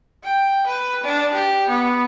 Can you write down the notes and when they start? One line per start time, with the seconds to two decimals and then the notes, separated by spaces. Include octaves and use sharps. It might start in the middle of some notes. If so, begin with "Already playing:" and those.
0.24 G5
0.67 B4
1.03 D4
1.33 G4
1.68 B3